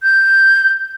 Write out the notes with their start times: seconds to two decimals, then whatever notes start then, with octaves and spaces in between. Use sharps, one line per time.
0.03 G6